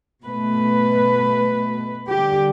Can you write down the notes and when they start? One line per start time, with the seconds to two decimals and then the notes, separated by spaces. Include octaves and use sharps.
0.24 B2 A3 B4
2.11 D3 G3 G4